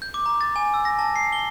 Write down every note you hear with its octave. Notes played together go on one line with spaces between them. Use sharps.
G6
D6
A#5
A6
G#5
E6
A#6
A5
C7
G7